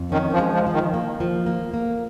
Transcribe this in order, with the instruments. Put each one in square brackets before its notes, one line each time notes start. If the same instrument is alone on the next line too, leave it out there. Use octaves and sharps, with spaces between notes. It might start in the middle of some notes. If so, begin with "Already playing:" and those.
Already playing: [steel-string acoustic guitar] F2
[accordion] D#3 [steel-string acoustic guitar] C#4
[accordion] F3
[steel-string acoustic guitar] G#3
[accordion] F3
[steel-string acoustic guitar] F3
[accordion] D#3
[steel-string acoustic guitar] A#3
F3
A#3
A#3